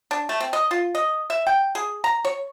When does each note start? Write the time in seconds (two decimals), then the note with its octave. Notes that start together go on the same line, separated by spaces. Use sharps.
0.11 D4
0.29 A3
0.40 C4
0.53 D#5
0.71 F4
0.95 D#5
1.30 E5
1.47 G5
1.75 G#4
2.04 A#5
2.25 C#5